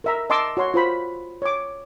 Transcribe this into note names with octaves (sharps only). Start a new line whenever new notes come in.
A#4 E5 A#5
D#5 A5 C6 D6 E6
F#4 C#5 C6
F4 C5 B5
C#5 D6